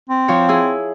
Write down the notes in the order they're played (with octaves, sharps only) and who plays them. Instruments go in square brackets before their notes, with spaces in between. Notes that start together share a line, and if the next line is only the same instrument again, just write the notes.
[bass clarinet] C4
[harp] F3 C#5
E4 G#4